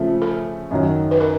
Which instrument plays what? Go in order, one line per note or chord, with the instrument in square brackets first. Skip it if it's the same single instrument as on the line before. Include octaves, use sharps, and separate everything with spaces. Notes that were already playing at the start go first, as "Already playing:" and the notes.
Already playing: [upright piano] C#3 F3 A3
[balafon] A4
[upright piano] F#2 D#3 F#3
[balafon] B4
A#4